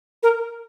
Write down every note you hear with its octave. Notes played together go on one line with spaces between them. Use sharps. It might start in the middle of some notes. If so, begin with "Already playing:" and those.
A#4